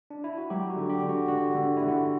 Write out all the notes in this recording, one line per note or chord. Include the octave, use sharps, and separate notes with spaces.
D4
E4
F#4
F#3 G4
F#4
D3
G4
D3
F#4
D3 F#4
D3
D3 E4
F#4